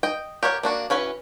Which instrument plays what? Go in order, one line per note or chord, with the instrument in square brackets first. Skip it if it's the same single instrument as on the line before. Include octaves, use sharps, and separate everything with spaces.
[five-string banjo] D#5 G5
G4 A#4 C#5 D#5 F#5
A#3 D4 F#4
E3 C#4 F#4 B4